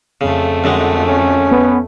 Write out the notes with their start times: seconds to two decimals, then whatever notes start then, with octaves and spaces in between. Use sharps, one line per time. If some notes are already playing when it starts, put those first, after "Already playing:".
0.21 F2 C#3 A3
0.64 F#2 D3 G#3
1.08 C#4
1.51 B3